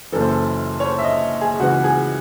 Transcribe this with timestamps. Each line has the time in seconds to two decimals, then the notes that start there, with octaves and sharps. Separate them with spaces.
0.12 F#1 F#2 E3 A4
0.21 C5
0.29 A4
0.80 C#5
0.85 C5
0.98 E5
1.04 D#5
1.41 G#4
1.60 C#2 C#3 E3 F#4
1.84 G#4